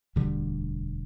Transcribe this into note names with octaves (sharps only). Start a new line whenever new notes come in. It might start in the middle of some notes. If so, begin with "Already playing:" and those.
E1 D2 D3 G3